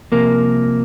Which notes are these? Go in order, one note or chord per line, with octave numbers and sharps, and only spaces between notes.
C2 C3 F3 A#3 A#4